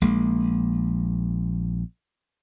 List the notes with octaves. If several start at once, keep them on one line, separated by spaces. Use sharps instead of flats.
A#1 G#3 A#3